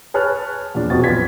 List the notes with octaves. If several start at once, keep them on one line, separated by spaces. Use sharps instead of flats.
G#4 B4 C#5 A5 F6 F#6
E2 A#2 D4
F2 B2 F#4 A6
B1 F4 B4 G#6 B6